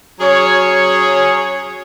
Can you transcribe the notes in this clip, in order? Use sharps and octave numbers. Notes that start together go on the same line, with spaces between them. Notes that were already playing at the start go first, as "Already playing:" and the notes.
F#3 C#4 G#4 C#5